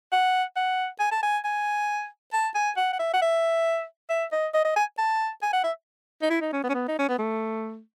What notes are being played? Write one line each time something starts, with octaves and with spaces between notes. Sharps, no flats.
F#5
F#5
G#5
A5
G#5
G#5
A5
G#5
F#5
F#5
E5
F#5
E5
E5
D#5
D#5
D#5
G#5
A5
G#5
F#5
E5
D#4
E4
D#4
C#4
B3
C#4
B3
D#4
C#4
B3
A3